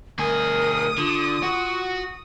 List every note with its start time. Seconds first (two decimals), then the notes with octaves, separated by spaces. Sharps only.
0.19 D2 G#4 A#4 D#6
0.98 D3 F4
1.43 F#4